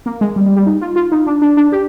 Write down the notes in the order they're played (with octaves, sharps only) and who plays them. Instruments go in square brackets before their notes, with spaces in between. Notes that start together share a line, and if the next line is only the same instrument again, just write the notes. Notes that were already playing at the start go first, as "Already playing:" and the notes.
[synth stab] A#3
G#3
G3
G3
G3
D#4
F4
F4
D#4
D4
D4
D4
G4